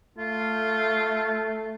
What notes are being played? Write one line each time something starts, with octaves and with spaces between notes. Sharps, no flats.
A3 F4